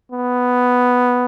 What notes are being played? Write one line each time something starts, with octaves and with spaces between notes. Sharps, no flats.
B3